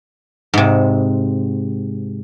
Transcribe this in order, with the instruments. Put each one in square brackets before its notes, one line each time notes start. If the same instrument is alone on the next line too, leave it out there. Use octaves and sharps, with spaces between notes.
[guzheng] G#2 C3